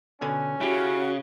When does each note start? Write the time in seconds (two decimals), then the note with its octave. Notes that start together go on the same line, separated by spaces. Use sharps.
0.21 B2 D3 C#4 G#5
0.61 C#3 E4 F#4 G4